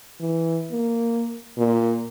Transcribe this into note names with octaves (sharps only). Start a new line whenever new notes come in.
E3
A#3
A#2